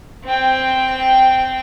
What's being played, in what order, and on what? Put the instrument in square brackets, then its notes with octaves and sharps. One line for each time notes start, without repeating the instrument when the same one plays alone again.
[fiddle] C4 G5